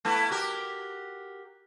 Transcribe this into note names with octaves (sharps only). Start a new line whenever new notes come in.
A3 B3 E4
F#4 G4 A#4